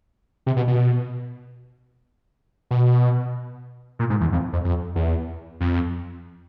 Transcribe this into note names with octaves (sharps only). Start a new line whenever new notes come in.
C3
B2
B2
B2
A#2
G#2
E2
F2
F2
F2
E2
F2